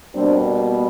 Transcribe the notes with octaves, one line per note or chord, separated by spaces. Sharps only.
B2 G3 A#3 C4 D4